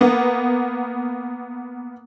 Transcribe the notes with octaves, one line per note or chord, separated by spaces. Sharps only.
A#3 B3